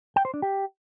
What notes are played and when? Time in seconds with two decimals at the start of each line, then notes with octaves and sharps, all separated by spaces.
0.16 G5
0.25 C5
0.34 D4
0.42 G4